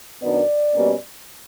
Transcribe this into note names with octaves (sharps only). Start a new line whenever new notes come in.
F#2 D#3 F#3 B3 D4 D5
B2 G3 A#3 C#4